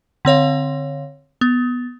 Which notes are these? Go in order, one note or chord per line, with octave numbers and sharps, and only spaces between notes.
D3 C4 C#5 F5
B3